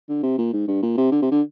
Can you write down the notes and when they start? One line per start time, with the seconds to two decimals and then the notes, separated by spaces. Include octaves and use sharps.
0.09 D3
0.23 C3
0.38 A#2
0.53 G#2
0.68 G2
0.82 A#2
0.97 C3
1.12 D3
1.22 C3
1.31 D3